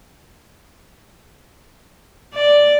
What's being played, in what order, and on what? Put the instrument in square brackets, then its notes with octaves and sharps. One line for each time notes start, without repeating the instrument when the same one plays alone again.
[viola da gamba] D5